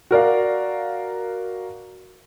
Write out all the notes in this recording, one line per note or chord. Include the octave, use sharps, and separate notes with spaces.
F#4 A#4 D5 F5